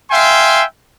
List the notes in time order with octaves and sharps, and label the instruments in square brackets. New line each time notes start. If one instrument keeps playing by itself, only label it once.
[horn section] E5 F5 G5 G#5 C6